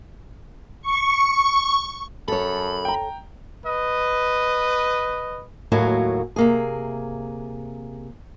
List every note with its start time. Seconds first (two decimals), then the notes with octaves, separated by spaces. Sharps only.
0.82 C#6
2.28 F#2 A4 C#5 B5
2.85 G5 A#5
3.66 B4 D#5
5.72 D#2 A2 F#3 A#3 F#4 G#5
6.36 C3 A#3 G#4